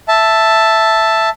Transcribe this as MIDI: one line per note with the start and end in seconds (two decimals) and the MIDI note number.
0.08 1.29 76
0.08 1.29 81